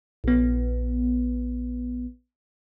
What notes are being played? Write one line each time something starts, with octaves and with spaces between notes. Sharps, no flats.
A#1 B3